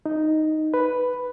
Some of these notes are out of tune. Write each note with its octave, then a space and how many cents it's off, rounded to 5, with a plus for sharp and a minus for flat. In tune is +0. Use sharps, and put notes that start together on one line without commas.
D#4 +0
B4 +5